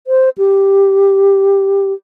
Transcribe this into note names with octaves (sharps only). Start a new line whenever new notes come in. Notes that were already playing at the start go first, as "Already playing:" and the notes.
C5
G4